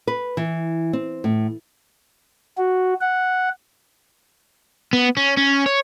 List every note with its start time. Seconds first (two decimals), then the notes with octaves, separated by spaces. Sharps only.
0.07 B4
0.37 E3
0.93 C4
1.24 A2
2.58 F#4
3.01 F#5
4.93 B3
5.17 C#4
5.37 C#4
5.66 C#5